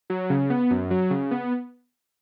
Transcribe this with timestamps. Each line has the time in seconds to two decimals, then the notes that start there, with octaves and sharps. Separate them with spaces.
0.10 F#3
0.30 C#3
0.50 B3
0.71 F#2
0.91 F#3
1.10 C#3
1.31 B3